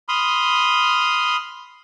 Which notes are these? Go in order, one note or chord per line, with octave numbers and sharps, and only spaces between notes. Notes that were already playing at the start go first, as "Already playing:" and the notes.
B5 C6 D#6 F6